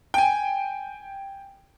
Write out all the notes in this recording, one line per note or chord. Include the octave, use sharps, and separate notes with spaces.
G5 G#5